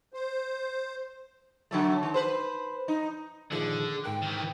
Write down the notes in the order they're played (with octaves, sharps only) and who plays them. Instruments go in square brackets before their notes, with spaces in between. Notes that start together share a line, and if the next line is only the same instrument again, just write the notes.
[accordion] C5
[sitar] D3 F#3 A3
D#3
B4 C5
D#4
[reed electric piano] A#2 D#3 F3 [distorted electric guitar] D3 [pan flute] G#4
[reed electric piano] G#2 A#4 F#6 [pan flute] G5
[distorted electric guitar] D#3 E3